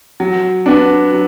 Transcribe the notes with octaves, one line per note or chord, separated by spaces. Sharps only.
F#3
B3 D4
F#3